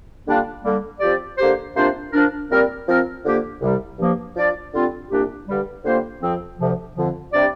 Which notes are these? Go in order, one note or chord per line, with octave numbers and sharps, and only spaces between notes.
D3 G3 A#3 D4 F4
D3 G3 A#3
F3 C4 G4 D5
D3 A#3 G4 C5
C3 A#3 D4 F4 C5
F3 D4 A#4
A#2 G3 C4 A#4 D5
F3 C4 A#4
D3 F3 A#3 G4
C2 C3 G3
G2 F3 A#3
F3 D4 F4 D5
D3 G3 C4 F4
C2 A#2 A#3 D4 G4
G2 D3 G3
D3 G3 A#3 F4 C5
F2 F3 C4
D2 C3 F3
F2 D3 F3
C3 G3 D4 G4 D5